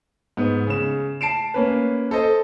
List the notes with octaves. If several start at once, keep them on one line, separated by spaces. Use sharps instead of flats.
G#2 B3
C#3 E7
A5 C7 D7 E7
A#3 C#4 B4
A4 C5 D#5